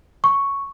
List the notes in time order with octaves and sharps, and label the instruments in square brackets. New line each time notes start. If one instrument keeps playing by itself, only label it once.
[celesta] C#6